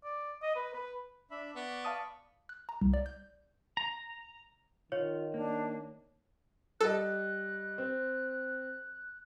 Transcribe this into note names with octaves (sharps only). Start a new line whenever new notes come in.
D5
D#5
B4
B4
D4 E5 B5
B3 D5 B5 C#6
F5 A5 D#6
F#6
A#5
C2
D5
G6
A#5
D#3 F4 C#5
A#3 D4
G3 A4 D#5 F#6
C4